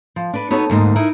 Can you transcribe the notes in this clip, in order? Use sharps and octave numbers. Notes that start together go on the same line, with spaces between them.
F3
D4 B4
B3 D#4 F#4 A4 C#5
D2 G#2 A#3 D#5
D#4 E4 A#4